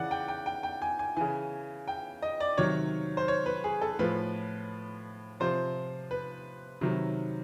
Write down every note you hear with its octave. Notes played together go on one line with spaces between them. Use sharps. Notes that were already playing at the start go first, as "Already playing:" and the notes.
Already playing: C#3 E3 D5 F#5
G5
G5
G5
G5
G#5
G#5
C#3 E3 G#5
G5
D#5
D5
C3 D#3 F#3 C#5
C5
C#5
B4
G#4
A4
A2 F3 B4
C3 F3 C5
B4
C3 D#3 F#3